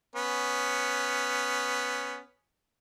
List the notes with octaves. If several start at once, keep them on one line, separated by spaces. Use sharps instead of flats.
B3 C#4